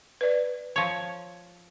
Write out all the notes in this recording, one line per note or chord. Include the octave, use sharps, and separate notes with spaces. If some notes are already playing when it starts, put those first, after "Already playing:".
B4 D5
F3 C#5